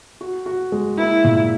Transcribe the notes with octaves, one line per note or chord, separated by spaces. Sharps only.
F#4
F#4
G#3
A#3 E4
A#2